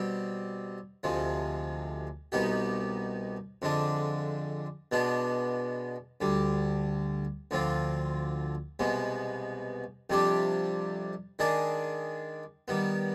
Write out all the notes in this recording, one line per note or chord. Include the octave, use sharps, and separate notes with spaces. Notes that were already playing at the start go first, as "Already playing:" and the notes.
Already playing: B2 G3 C4
D2 C3 F3 G#3
C2 B2 B3 D#4 G4
F2 D3 G#3 D4
B2 G#3 B3 D4
D2 D3 G3
D2 D3 F3 C4 F4
C2 B2 G#3 B3
F2 C3 G3 D4 G4
D#3 G#3 D4 G#4 D5
D#3 G3 B3